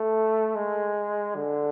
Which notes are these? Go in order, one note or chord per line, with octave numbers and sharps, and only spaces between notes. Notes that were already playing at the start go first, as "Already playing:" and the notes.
Already playing: A3
G#3
D3